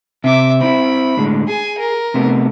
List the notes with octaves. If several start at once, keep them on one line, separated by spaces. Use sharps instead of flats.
C3 E5 D6
C4 E4 B5
A2 D3 G#3
G#4 G#5
A#4
C3 A3 B3